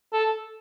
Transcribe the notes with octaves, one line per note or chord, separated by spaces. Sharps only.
A4